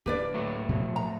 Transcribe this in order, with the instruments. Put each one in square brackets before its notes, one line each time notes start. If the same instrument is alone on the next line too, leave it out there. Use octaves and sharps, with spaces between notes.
[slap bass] D1 A#3 D4 [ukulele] G4 B4 D5
[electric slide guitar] A2 F#3 A3
[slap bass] A#2 F3
[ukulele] A#5